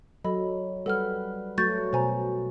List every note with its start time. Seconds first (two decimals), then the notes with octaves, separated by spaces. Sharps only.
0.24 F#3 A4 D#5 B5
0.86 G3 A4 B4 F#5 F6
1.58 F#3 A3 F#4 C#6 G6 A6
1.93 B2 C5 G#5 A#5